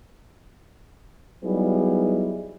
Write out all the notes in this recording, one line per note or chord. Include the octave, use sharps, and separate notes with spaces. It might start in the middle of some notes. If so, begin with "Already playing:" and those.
F#3 G3 B3 D#4 E4 G#4